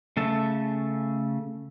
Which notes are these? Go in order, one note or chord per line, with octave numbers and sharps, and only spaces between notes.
C#3 A3 E5 A5